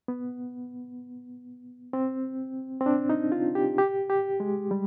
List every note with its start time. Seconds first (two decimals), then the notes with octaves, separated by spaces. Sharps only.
0.08 B3
1.93 C4
2.81 C4
2.86 D4
3.10 D#4
3.32 F4
3.55 G4
3.78 G4
4.10 G4
4.40 G#3
4.71 G3